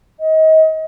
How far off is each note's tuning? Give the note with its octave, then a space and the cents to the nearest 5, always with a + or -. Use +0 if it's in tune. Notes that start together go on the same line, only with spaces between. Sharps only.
D#5 +30